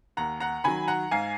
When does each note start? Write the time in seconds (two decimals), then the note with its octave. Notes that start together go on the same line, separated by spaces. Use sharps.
0.17 D#2 F#5 A#5
0.40 F#5 A#5
0.64 D#3 F#3 G#5 B5
0.88 F#5 A#5
1.11 G#2 F5 G#5